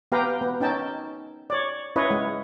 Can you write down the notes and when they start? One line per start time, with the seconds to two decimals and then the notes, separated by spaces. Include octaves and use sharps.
0.12 B3 G4 B4 F5 G5 A#5
0.41 B3
0.60 C#4 D#4 G5 A5
1.50 C#5 D5
1.96 C#4 E4 B4 C#5 D#5
2.11 G#3